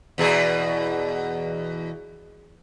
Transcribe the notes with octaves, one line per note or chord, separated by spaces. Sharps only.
E2 B2 G#4